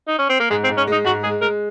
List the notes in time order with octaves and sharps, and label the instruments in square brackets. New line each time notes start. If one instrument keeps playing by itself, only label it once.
[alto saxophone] D#4
C#4
C4
A#3
[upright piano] G#2 [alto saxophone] G#3
[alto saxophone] C4
[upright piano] G#2
[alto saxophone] C#4
[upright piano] G#3 [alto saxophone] D#4
[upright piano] G#2 [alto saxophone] F#4
[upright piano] G#3 [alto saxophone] G#4
[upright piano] G#3 [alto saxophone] A#4